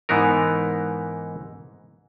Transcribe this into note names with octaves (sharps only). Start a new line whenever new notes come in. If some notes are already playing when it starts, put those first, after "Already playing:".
G#2 E3 B3 D#4 A#4